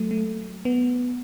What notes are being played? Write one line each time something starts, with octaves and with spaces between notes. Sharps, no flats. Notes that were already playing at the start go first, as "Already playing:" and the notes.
Already playing: F#3 A3
A3
B3